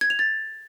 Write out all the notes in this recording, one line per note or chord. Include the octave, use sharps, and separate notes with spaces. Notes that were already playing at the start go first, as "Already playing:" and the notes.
G#6
F7
A6